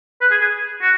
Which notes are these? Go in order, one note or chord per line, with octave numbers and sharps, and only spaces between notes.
B4
G#4
G#4
F#4